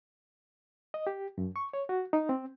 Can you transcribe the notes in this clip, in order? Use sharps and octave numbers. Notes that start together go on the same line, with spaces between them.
D#5
G4
F#2
C#6
C#5
F#4
D#4
C4